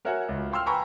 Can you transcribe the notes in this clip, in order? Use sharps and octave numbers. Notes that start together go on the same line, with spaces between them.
F#4 A#4 C#5 E5 F#5 G#5
C#2
F5 G5 C6 E6 F6
B4 G5 G#5 A#5 B5 C#6